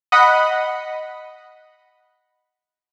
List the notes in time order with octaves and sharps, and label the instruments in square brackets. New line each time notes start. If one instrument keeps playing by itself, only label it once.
[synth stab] D#5 F#5 B5